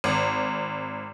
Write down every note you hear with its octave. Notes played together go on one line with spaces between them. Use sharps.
G#1